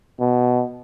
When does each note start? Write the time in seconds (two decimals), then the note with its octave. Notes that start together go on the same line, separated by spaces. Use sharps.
0.20 B2